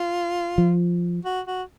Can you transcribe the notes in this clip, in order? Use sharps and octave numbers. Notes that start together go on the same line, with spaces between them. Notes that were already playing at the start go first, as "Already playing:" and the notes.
Already playing: F4
F3
F#4
F#4